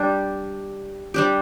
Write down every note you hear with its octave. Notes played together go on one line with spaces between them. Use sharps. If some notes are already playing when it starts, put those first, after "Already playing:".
Already playing: G3 D4 G4
G3 D4 G4